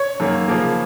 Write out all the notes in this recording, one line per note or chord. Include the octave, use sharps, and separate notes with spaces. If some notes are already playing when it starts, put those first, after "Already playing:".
Already playing: C#5
F#2 D#3 A#3
C#3 F3 A#3